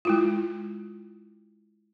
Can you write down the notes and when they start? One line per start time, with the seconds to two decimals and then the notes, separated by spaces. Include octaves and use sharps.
0.05 G#3 E4 F4